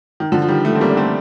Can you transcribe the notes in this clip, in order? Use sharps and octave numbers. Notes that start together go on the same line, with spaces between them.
D#3
D3 F3
F3
D#3 G3
F3 A3
C4
G3 A#3
D4
A3 C4